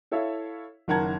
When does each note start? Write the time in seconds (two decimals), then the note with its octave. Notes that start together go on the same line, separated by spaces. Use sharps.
0.11 E4 A4 C#5 E5 F5
0.88 F#1 D#3 A#4 F#5 A5 G#6